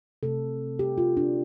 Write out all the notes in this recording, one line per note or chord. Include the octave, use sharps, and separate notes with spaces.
C3 A3 A4
G4
F4
D4